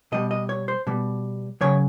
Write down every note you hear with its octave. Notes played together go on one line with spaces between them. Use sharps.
B2 G3 D#5
D#5
C#5
C5
B2 G3
C#3 F#3 C#5